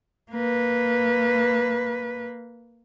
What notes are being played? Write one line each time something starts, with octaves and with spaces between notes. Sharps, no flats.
A#3 B4